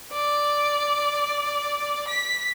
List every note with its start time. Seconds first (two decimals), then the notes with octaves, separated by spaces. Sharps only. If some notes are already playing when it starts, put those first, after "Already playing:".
0.13 D5
2.08 B6